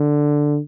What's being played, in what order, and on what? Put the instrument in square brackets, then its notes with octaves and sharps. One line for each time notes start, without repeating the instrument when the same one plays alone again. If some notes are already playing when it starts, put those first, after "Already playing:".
Already playing: [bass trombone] D3